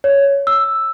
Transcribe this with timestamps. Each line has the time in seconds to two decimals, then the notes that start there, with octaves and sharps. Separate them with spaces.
0.04 C#5
0.47 E6